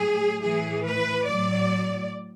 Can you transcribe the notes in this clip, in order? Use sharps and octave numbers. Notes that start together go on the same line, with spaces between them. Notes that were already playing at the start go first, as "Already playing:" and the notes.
Already playing: A2 F#3 G#4
A2 E3 G#4
B4
A2 F#3 D5